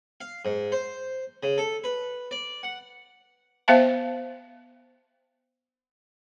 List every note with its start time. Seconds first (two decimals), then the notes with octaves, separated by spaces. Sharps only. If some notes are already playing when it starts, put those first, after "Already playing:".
0.21 F5
0.45 G#2
0.72 C5
1.43 C#3
1.58 A4
1.84 B4
2.31 D5
2.63 F#5
3.68 B3 C5 E5 F5 A5